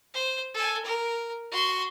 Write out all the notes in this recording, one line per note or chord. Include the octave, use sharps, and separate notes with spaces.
C5
A4 G#5
A#4
F#4 C6